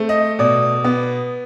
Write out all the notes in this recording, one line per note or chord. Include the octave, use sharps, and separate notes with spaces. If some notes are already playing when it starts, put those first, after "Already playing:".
Already playing: A3 C4
D#5
B2 D5
B3